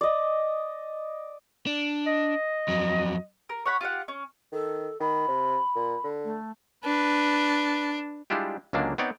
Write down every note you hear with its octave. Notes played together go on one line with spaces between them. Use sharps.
D5 D#5
D4
D#5
F2 F#3
A#4
C#5 F#5 B5
F4 G4 F5 F#5
C#4
D#3 A4
D#3 B5
C3
A#2
D3
A3
D4 B4
G3 G#3 D4 E4 F4 G4
C#2 D3 F#3 G#3 A#3 D4
B3 C4 D#4 C#5 D5 G5